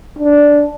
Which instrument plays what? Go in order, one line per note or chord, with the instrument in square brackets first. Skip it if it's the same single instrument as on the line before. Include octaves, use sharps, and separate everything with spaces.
[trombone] D4